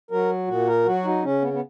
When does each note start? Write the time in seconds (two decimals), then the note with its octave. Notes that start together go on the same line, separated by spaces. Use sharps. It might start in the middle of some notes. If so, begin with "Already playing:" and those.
0.11 F#3 A#4
0.48 A#2 F#4
0.67 A#4
0.86 F#3 F#4
1.04 D#4
1.23 C#3 C#4
1.42 B3
1.53 B3